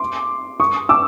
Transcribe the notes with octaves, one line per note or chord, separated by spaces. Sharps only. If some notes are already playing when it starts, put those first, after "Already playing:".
Already playing: C6 D6
C#6 D#6
D6 E6